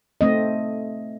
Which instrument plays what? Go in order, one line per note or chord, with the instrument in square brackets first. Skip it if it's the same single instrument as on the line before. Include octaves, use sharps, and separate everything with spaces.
[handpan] A3 C4 D#5